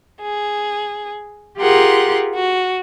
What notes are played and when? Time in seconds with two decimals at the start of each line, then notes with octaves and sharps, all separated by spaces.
0.22 G#4
1.57 F4 G4 G#4 A#4 F#5 C6
2.34 F#4